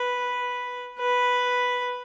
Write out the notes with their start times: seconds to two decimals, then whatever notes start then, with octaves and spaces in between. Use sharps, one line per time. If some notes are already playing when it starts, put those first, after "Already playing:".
Already playing: B4
0.99 B4